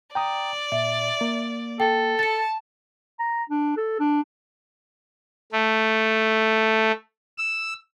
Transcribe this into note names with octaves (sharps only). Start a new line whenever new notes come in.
D5 G5 A#5 D#6
A#2 E5
A#3
A4 G5
A5 A6 C#7
A#5
D4
A4
D4
A3
E6